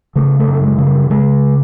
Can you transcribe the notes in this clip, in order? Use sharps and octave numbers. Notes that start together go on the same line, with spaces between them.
C#3 A3
A3
F#2
G#3
C#3
G3
C#3 G#3